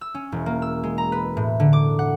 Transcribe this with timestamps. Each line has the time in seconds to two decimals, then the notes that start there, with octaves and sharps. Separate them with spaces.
0.01 E6
0.15 C#4
0.32 E1
0.46 A#3
0.62 E6
0.83 G#3
0.98 A#5
1.12 B4
1.37 A2
1.60 D3
1.73 D6
1.99 F#5